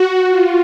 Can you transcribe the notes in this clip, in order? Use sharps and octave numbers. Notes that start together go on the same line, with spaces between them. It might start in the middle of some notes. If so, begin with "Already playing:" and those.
Already playing: F#4
F4